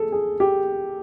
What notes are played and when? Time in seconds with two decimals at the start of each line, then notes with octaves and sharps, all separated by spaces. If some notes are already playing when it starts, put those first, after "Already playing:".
Already playing: G#4 A4
0.12 G#4
0.40 G4